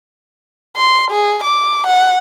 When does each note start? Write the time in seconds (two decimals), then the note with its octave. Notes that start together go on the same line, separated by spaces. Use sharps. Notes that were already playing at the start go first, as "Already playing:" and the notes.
0.76 C6
1.11 G#4
1.44 D6
1.87 F#5